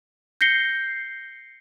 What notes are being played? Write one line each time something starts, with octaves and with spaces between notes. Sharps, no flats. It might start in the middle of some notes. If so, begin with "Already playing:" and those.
G6 A#6 C7 C#7 G7